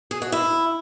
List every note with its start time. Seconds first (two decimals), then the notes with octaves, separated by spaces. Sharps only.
0.11 G#4
0.22 F#4
0.32 E4